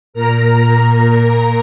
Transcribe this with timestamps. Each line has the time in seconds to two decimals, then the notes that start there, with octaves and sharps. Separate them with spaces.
0.14 A#2 A#4 A#5